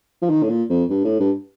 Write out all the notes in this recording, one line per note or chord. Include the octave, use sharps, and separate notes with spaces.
F3
D#3
A2
A#2
F2
G2
A2
G2